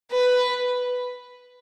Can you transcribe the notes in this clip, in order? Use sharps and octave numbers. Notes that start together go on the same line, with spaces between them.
B4